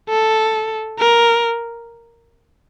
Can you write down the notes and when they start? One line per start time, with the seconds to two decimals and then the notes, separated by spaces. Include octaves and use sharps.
0.09 A4
0.99 A#4